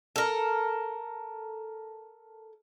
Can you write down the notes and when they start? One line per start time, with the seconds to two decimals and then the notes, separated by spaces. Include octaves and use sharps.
0.16 A4 A#4